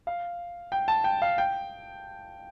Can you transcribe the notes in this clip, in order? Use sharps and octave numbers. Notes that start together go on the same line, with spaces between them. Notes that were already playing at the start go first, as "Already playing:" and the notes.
F5
G5
A5
G5
F5
G5